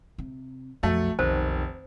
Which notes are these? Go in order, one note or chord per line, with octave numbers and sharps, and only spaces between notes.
C3
B1 F2 F#3 A3 A4
F1 B1 D#3 C5 A5